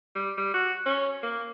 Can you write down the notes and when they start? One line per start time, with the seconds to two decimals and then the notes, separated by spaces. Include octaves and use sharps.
0.15 G3
0.38 G3
0.54 F#4
0.86 C#4
1.23 A#3